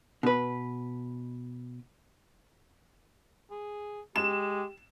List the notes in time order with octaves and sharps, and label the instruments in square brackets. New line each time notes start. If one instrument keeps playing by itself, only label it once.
[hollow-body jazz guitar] B2 B4
[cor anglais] G#4
[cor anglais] G#3 [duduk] G4 [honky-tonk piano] E7